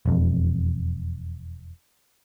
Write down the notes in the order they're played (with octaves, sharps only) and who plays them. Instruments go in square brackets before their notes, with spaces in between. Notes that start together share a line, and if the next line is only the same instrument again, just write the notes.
[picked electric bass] E1 F2